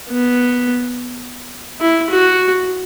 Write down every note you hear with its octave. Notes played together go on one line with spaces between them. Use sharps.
B3
E4
F#4